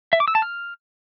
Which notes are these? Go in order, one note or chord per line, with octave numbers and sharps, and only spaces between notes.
E5
D6
E6
A5
F6